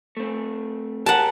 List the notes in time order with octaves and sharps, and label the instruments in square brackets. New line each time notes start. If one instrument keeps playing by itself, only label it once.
[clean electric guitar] A3 C4
[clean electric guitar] G4 G#4 A#4 [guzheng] F#5 A5